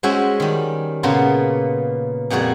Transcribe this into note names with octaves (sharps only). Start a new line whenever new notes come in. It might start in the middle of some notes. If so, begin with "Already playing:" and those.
G#3 C#4 F#4 C5 E5 G#5
D#3 G3
A#2 C#3 A#3 B3 A5 C6
F2 A#2 G3 F#4 G#4